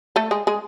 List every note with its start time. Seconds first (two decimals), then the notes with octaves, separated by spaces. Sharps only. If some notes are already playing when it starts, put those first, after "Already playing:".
0.16 A3 A4
0.31 G#3 G#4
0.47 G#3 G#4